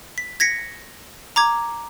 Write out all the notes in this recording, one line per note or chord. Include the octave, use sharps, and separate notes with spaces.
B6
G#6 A#6 B6 C#7
A#5 D6 G#6